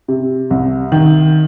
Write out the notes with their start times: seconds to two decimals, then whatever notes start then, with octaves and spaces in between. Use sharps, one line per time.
0.08 C3
0.50 C2
0.92 D#3